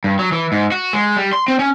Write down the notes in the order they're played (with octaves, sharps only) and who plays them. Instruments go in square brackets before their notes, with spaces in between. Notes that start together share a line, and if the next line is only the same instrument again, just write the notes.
[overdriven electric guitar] G2
F#3
E3
G#2
F#4
G#3
G3
C6
C4
C#4